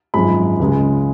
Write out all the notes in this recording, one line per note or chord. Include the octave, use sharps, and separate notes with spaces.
G#1 F#2 F3 G#3 B5
C#2 C#3 G#3